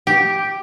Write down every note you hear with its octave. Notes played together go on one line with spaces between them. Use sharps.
G4